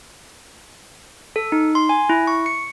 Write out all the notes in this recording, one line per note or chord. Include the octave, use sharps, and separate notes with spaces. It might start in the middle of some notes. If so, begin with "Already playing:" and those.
A4
D#4
C6
G#5
E4
C#6
C#7